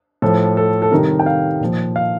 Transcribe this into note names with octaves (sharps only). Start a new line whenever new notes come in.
A2 F3 A4
A4
A4
C3 D#3 G3 A#4
G5
F5
A#2 F3
F5